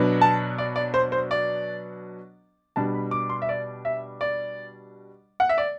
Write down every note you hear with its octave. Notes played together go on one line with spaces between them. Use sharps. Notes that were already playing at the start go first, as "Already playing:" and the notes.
Already playing: B2 F#3 B3 D4
A5
D5
D5
C5
C5
D5
B2 G3 D4 A5
B5
D6
C6
E5
D5
E5
D5
F#5
E5
D5